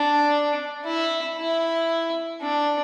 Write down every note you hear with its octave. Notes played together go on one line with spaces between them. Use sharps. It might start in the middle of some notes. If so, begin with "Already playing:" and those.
Already playing: D4
E4
E4
D4